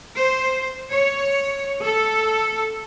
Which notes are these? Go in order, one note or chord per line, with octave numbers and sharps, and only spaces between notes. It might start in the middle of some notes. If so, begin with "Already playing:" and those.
C5
C#5
A4